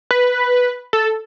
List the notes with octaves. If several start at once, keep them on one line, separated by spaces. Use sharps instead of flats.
B4
A4